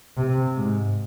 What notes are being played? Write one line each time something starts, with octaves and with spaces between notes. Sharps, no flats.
C3
G#2